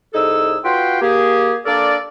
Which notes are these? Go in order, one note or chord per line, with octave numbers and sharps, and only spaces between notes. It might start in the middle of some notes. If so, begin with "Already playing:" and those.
C2 D#4 G#4 A4 E6
F4 F#4 B4 G5 C6
A#3 G4 G#4
A#3 D4 A4 A#4 D5